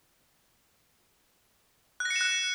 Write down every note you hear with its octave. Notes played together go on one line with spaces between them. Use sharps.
F#6
A#6
C#7
E7
F#6